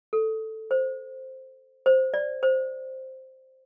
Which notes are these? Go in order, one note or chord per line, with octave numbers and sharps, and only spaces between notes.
A4
C5
C5
D5
C5